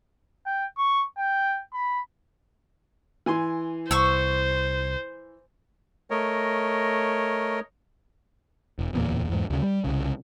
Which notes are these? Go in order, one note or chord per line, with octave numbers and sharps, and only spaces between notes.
G5
C#6
G5
B5
E3 G#5 C6
C2 C5 C#6 E6
A3 A#4 C#5 D#5
E1
D1 E2 A#2 A#3
E2 G#2
D2 C#3
G3
C2 C#3